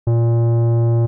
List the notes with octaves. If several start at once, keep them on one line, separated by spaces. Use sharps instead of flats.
A#2